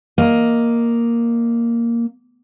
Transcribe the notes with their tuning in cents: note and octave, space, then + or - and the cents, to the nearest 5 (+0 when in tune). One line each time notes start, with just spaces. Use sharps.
A#3 +0 D#5 +0